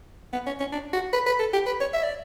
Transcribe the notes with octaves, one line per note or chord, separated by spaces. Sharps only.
B3
C#4
C#4
D4
F#4
B4
B4
A4
G4
B4
C#5
E5
D5